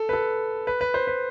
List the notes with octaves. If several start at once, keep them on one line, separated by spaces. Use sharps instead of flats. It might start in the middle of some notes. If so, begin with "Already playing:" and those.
Already playing: A4
B4
A4
B4
B4
C5
B4